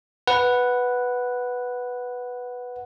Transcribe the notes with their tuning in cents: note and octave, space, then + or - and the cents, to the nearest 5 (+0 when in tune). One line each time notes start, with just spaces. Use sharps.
B4 +0 F#5 +0